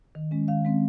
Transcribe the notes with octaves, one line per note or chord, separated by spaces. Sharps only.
D#3
G#3 C#4
D#3 F5
G#3 C4